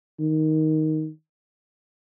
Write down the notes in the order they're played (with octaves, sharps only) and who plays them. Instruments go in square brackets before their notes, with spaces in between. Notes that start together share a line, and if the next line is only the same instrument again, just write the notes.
[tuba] D#3